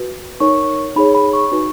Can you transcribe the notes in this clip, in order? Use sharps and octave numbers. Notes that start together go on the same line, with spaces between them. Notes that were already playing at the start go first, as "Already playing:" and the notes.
Already playing: F#4 B4
D#4 A#4 C#5 C#6
D#4 G#4 C#5 B5
B5
C#6
D#4 F#4 B4